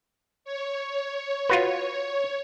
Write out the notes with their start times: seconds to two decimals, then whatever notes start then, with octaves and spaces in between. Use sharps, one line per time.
0.45 C#5
1.49 F4 F#4 B4